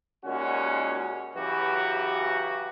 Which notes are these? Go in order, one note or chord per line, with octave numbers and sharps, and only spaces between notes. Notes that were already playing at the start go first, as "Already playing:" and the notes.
D#2 A#2 G#3 C#4 F#4
C#3 E3 F#3 F#4 G4 B4